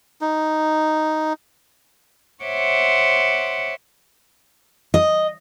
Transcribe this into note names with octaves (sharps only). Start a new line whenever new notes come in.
D#4
C5 C#5 E5 F#5 C6 D6
D#5